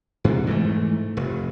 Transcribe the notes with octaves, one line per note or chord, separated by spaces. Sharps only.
G2 C3
G#2 E3 F#3 A3
F1